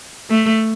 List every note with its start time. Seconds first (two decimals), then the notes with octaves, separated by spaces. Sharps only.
0.30 A3